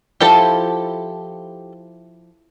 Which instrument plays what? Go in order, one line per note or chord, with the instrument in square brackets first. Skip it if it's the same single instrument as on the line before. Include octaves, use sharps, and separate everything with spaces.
[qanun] F3 E4 [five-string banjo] G4 A4 A5